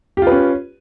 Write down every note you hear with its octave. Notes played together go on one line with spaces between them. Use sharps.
C#4 F4 G4 B4